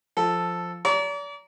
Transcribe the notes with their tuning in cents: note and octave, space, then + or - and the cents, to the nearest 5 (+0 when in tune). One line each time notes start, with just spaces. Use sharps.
F3 +0 A4 +0
D5 -40 A#5 +0 D6 -45